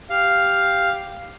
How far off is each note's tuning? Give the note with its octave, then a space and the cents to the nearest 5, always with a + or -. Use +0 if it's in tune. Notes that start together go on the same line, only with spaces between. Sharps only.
G4 +0 F5 +0